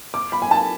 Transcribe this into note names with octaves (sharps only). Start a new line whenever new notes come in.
D6
B5
G#5
A5